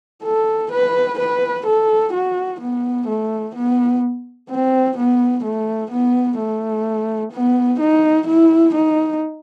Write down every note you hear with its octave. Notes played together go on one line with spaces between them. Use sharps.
A4
B4
B4
A4
F#4
B3
A3
B3
C4
B3
A3
B3
A3
B3
D#4
E4
D#4